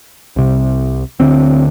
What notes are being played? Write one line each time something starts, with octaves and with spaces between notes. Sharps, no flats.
C2 C3
D2 D3 C4